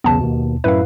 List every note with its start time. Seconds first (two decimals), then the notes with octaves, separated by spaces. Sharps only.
0.04 B1 E2 C#3 B3 A5
0.20 D#2 B2
0.64 F#2 A2 E4 B4 F5